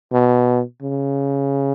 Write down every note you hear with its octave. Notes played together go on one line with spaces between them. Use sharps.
B2
C#3